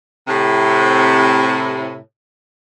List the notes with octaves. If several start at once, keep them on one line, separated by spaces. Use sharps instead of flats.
A2 C3